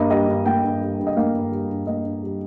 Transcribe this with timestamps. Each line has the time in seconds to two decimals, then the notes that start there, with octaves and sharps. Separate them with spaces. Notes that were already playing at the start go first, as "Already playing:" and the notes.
Already playing: G2 A#3 D#5
0.10 G3 D#5
0.28 G2
0.46 A#3 G5
0.64 G2
0.81 G3
0.99 G2
1.07 D#5
1.17 A#3 F5
1.34 G2
1.52 G3
1.70 G2
1.87 A#3 D#5
2.05 G2
2.23 G3